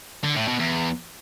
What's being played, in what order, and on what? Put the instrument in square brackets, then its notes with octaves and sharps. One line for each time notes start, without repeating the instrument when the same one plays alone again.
[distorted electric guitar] D3
A2
B2
E2